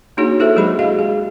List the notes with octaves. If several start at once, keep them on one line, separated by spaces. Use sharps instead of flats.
A#3 D4 D#4 F#4 G#4 C#5
E4 G4 A4 C5 E5
F#3 G#3 G4 G#4 D#5 B5
F#4 G#4 D#5 F5
G#4